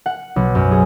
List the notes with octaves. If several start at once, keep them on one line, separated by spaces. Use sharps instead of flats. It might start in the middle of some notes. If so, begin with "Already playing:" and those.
F#5
B1
F#2
G#4